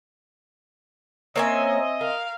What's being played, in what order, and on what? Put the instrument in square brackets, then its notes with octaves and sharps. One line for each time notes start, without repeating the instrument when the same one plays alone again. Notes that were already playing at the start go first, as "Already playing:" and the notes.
[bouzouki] A#3 C#4 C#5 [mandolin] C4 E5 G#5 [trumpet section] D#5
[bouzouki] A#4 [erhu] F5